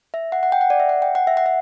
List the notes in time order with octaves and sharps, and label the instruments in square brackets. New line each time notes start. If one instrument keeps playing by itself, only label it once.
[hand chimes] E5
F#5
F#5
G5
F#5
D5
E5
F#5
G5
F#5
E5
F#5
E5